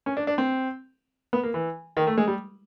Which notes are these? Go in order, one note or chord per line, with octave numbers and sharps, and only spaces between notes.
C#4
D4
D4
C4
B3
A#3
E3
D#3
A3
G#3
G3